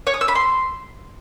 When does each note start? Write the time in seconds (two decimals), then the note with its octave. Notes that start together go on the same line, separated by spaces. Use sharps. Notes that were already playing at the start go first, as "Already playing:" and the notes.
0.07 C#5
0.14 D#6
0.21 E6
0.28 B5
0.35 C6